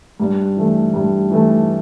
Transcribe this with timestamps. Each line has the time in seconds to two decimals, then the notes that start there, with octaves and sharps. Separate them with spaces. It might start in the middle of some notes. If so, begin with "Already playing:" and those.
0.20 G2
0.57 E3 A3
0.94 G2
1.30 E3 A3